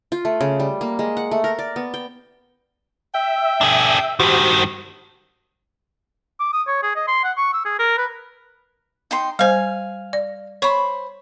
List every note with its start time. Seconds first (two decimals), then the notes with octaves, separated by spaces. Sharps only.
0.12 F4
0.25 A3
0.41 C#3
0.60 G3
0.81 A#3
0.99 G#3
1.17 F#5
1.31 A3
1.44 A#4
1.59 D5
1.76 B3
1.94 G5
3.15 E5 G5
3.61 D4 G#4
4.20 G2 D#3 F#4 G4 C5
6.40 D6
6.53 D#6
6.68 C#5
6.83 G#4
6.96 D#5
7.08 C6
7.24 F#5
7.37 C#6
7.54 E6
7.65 G#4
7.79 A#4
7.98 B4
9.11 D#4 G5 C6
9.39 G3 C5 F5 G#5
10.13 D5
10.62 C5 C#5 B5 C#6